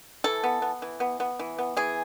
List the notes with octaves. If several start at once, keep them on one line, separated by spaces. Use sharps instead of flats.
E3 A4
B3
B3
E3
B3
B3
E3
B3
E3 G#4